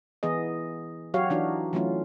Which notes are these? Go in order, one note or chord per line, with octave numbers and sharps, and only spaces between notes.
E3 B3 G#4 D#5
F#3 F#4 G4 C#5 F5
E3 D4 D#4 F#4
E3 F#3 A3 C#4 F4